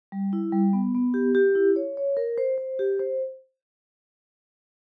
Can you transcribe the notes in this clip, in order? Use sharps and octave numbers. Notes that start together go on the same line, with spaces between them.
G3
E4
G3
B3
B3
G4
G4
E4
C#5
C#5
A#4
C5
C5
G4
C5